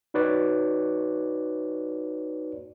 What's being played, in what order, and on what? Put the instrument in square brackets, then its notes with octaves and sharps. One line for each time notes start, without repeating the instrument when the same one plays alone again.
[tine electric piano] D#4 F#4 B4 C#5 D5